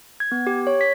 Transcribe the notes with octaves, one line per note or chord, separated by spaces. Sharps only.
G#6
B3
G4
C#5
B6